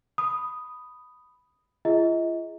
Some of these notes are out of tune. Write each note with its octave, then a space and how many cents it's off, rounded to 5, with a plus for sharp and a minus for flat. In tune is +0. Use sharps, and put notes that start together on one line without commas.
B5 +5 D#6 +0
F4 -45 G#4 +0 D#5 +35